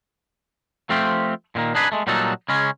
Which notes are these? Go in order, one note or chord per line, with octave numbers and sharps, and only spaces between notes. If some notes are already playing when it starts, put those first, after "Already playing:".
F3 A3 C4 F4 G4
A#2 D3 D#3 A#3
D4 D#4 G#4 B4
G#3 A3
A#2 F#3 G3 D#4 F#4 A4
C#3 G#3 C#4